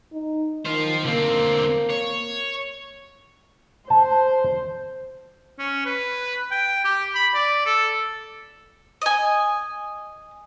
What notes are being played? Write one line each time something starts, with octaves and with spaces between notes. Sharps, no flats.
D#4
D#3 F4 C5
D3 A#3 C4
C#5
C5 A5
C#4
B4
G5
G4
B5
D5
A4
D#5 G#5